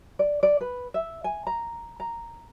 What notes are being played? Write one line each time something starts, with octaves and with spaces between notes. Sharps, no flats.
D5
D5
B4
E5
G#5
A#5
A#5